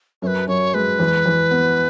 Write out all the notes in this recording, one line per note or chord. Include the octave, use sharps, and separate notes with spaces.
F#2 B4 C#5
F#2 C#5
G#3 B4
E2
E2
B3